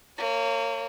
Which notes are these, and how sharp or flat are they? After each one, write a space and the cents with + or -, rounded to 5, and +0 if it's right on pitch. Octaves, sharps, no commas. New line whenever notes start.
A#3 -30 C#5 +0